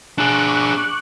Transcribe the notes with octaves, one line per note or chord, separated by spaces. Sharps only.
D4 G#4 C#6 D6 F#6